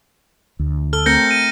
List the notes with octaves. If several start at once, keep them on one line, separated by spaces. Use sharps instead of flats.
D2
A4 F6 G7
A3 C4 A#4 G6 A#6 C#7
D#7